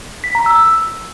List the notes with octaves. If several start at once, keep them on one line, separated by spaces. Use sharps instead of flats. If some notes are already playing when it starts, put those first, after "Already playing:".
B6
A#5
E6